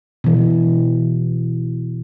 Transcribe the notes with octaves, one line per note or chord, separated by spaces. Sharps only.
B2 E3